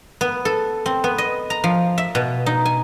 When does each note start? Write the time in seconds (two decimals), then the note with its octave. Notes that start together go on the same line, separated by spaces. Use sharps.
0.21 B3
0.45 A4
0.86 C4
1.04 B3
1.18 D#5
1.50 A#5
1.64 F3
1.98 E5
2.15 B2
2.46 D#4
2.65 G#5